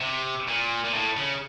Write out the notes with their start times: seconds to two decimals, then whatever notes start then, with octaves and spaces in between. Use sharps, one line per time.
0.01 C3
0.47 A#2
0.84 A#2
0.93 A2
1.17 C#3